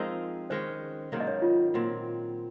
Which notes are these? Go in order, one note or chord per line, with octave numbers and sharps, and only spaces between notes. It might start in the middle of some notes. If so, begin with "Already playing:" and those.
Already playing: F3 G#3 C4 D#4 A#4
D#3 G#3 C#4 C5
G#2 D#3 F#3 A#3
D#5
C#5
F4
A#2 F#3 C4